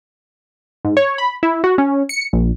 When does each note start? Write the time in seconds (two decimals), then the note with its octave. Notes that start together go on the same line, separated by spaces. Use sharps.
0.85 G#2
0.97 C#5
1.18 B5
1.43 E4
1.64 F#4
1.78 C#4
2.09 C#7
2.33 A#1